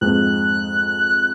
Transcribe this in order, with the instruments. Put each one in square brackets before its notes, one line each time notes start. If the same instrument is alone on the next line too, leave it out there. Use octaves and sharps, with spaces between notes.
[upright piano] F2 G#2 [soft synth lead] F#6